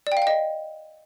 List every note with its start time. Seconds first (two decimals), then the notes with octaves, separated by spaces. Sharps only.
0.07 D5
0.12 G5
0.17 F5
0.22 G5
0.27 D#5